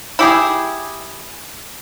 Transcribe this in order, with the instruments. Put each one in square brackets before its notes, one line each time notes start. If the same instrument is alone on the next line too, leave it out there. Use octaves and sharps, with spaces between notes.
[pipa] E4 G4 G#4